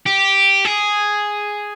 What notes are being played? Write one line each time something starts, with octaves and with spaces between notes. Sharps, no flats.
G4
G#4